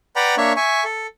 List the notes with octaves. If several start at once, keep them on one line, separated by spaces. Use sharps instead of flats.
B4 D5 F#5 G5 A#5 B5
A#3 D4 C#5 E5 C#6
E5 G#5 C#6
A4